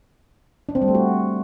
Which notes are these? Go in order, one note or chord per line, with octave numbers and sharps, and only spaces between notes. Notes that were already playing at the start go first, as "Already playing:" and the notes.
D4
C4
G3
A3
F#4